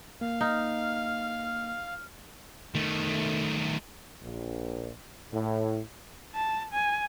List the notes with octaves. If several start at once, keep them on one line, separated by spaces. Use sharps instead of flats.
A#3 F5
D#4 F6
D#3 A3
A#1
A2
A5
G#5